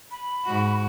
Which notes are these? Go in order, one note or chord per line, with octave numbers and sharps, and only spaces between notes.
B5
G#2 F#4